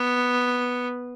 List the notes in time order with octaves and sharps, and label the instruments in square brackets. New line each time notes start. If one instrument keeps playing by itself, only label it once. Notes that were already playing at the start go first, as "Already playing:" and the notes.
Already playing: [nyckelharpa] B3